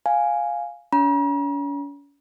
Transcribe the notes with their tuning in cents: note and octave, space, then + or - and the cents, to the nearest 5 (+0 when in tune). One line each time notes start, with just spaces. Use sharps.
F5 +5 G#5 +0
C#4 +40 A#5 +45